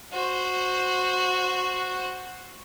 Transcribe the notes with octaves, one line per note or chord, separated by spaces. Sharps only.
F#4 C5